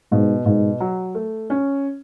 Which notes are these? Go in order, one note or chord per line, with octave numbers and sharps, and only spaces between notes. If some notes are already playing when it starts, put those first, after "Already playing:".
G#2 B2
G#2 B2
F#3
A3
C#4